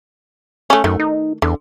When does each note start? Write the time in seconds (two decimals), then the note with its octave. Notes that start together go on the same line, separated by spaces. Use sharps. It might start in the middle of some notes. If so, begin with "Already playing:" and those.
0.70 A3 C#4
0.84 F#2 D#3 A3
1.00 D#4
1.42 E2 D3